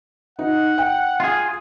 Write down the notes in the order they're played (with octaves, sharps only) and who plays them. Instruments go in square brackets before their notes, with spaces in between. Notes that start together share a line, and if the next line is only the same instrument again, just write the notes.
[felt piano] D#4 [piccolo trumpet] F#5
[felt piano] G5
[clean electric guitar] F4 G#4